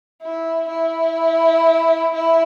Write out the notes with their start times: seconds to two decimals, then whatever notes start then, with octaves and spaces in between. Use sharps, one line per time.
0.22 E4
0.69 E4
2.14 E4